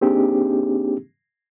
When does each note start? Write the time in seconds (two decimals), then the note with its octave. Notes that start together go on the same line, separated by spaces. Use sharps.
0.01 A#3 C4 D4 D#4 G4 G#4